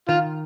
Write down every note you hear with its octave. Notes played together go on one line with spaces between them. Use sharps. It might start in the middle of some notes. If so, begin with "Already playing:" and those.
D#3 F4